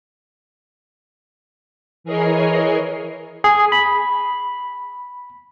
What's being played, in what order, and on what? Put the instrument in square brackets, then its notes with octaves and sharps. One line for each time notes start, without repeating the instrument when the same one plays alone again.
[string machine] E3 G#4 A#4 C#5 D#5 C7
[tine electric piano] G#4
B5